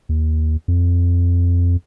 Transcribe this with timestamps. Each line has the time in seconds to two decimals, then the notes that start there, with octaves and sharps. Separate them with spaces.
0.09 D#2
0.68 F2